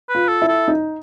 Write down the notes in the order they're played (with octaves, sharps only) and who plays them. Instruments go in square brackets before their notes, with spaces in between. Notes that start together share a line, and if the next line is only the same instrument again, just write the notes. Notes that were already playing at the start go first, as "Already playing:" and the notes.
[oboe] B4
[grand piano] F4
[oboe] A4
[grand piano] E4
[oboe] A4
[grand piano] D#4